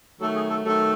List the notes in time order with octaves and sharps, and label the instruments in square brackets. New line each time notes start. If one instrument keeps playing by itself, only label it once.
[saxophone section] D#3 F#3 A3 [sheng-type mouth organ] A4
[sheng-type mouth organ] G#4
A4
[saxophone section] D#3 F#3 A3 [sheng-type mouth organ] A4